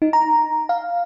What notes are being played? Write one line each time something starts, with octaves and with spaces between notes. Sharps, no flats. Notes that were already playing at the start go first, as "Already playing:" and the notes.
D#4
A#5
F5